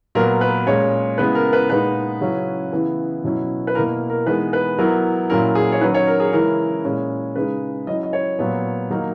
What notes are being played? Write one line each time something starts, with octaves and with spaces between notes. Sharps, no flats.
A#2 F#3 B3 A#4
B4
A#2 G#3 C#4 C#5
C#3 G#3 B3 E4 B4
A#4
B4
A#2 G#3 B3 D#4 B4
C#3 F#3 C#4 E4
C#3 E3 B3 E4
B2 F#3 C#4 E4
B4
B2 A#3 E4 A#4
A#4
E3 G#3 B3 D#4 B4
B4
F#3 B3 E4 A#4
A#2 F#3 C#4 E4 A#4
G#4
C#5
D#3 F#3 C#4 B4
C#5
A#4
G#4
C#3 E3 G#3 C#4 E4 A#4
A#2 G#3 C#4 E4
C#3 G#3 D#4 B4
F#3 C#4 E4 D#5
D#5
C#5
A#2 F#3 B3
D#3 F#3 A#3 D#4